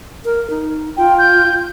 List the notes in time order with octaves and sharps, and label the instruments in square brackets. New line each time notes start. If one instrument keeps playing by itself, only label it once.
[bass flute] A#4
D#4
[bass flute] F4 [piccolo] G5
[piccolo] G6